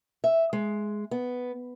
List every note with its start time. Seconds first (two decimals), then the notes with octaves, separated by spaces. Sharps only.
0.24 E5
0.53 G#3
1.11 B3